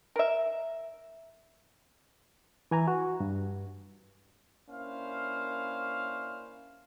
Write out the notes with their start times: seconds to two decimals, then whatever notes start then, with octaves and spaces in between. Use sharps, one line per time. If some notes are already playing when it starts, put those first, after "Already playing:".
0.16 A#4 E5
2.71 E3 G#5 A#5
2.88 F#4
3.20 G2
4.69 A#3 C#4 D4 E4 C5 F5